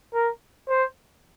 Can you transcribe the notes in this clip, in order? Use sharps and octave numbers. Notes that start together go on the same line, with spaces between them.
A#4
C5